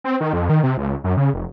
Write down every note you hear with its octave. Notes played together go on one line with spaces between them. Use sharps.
C4
D#3
F2
D#3
C3
C#2
F#2
C#3
F1